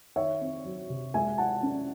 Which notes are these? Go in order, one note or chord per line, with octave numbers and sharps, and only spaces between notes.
D#3 C#5 E5
C4
F#3
C3
G#3 E5 G#5
E4 F#5 A5
C#4